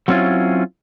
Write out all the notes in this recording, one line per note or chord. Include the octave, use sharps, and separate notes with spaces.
F#3 C4 C#4 E4 F4